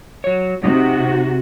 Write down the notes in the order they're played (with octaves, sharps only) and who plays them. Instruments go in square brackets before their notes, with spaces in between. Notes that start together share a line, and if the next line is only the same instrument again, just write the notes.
[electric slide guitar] F#3 C#5
[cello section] C3 F#4 [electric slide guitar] D#4